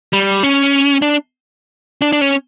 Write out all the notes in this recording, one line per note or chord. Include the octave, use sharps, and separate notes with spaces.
G3
C#4
D4
D4
D4
C#4